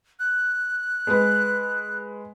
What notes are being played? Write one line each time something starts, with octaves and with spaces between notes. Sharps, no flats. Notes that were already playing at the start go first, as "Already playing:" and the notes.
F#6
G#3 B4